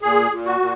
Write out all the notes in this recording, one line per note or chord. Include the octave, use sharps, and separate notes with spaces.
A#2 G#4
A#2
F#4
A#2